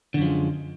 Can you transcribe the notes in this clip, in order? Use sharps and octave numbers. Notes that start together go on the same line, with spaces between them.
F#2 D3 F3 G#3